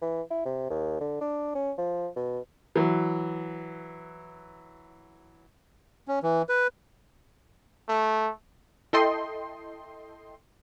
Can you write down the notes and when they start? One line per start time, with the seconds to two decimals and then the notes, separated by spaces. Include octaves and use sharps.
0.02 E3
0.31 E4
0.45 C3
0.70 D#2
1.01 D3
1.21 D4
1.55 C#4
1.78 F3
2.16 B2
2.76 E3 F#3
6.08 C#4
6.23 E3
6.49 B4
7.88 A3
8.93 E4 A4 D#5 G5 C6